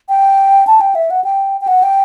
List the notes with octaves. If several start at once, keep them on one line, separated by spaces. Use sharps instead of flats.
G5
A5
G5
E5
F#5
G5
G5
F#5
G5